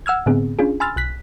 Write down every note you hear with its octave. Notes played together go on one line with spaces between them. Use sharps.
F#5 E6 F6 G#6
A2 D3 B3 C4 G#4
C#4 D4 F4 G#4
G#5 B5 C6 E6 F6 A6
B1 F#6 B6